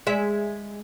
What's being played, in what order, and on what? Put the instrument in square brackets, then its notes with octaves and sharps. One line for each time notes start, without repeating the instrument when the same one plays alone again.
[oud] G#3 E5